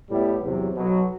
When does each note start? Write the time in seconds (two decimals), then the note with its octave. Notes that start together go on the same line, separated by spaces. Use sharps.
0.10 A2 G3 B3 E4
0.42 E2 C3 F#3
0.74 B1 B2 F#3